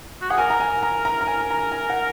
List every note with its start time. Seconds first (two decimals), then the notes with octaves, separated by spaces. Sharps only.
0.21 F#4
0.30 G#4 F#5
0.38 A#4 G#5
0.50 A#5
0.60 G#5
0.83 A#5
1.05 A#5
1.21 A#5
1.27 G#5
1.50 A#5
1.72 G#5
1.90 F#5